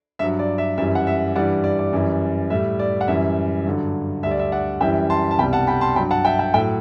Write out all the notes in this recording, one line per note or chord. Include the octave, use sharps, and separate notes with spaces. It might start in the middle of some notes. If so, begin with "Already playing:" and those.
G2 F#3 E5
D5
E5
F#2 E3 G3 E5
F#5
E5
G2 E3 G3 D5 F#5
D5
D5
F#2 E3 G3
A2 G3 E5
D5
F#5
F#2 E3 G3 E5
G2 D3 F#3
D2 D3 G3 E5
D5
E5
D5 F#5
F#2 E3 G3 E5 G5
A5 C6
A5
C2 B2 G3 G5 B5
F#5 A5
G5 B5
A5 C6
G2 F#3 G5 B5
F#5 A5
E5 G5
E5 G5
A2 F#3 E5 G5